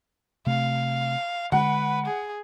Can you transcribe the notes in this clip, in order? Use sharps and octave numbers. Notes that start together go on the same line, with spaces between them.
C3 A3 F5
D3 G#3 B4 F#5
G#4